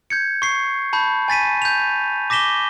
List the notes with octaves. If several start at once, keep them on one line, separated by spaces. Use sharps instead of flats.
G6 G#6 C#7
C#6 C7
A5 B5 G6
G#5 A6 B6 D#7
G6 F7
D6 A#6 B6 E7 G7